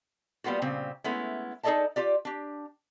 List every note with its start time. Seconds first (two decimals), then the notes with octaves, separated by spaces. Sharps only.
0.44 G3 A#3 B3 F4 F#4
0.62 A#2 C#3 G3 C4
1.04 G#3 A3 B3 C#4 E4
1.63 D#4 G#4 A4 D5 D#5 A5
1.96 F4 G4 D5
2.25 D4 G4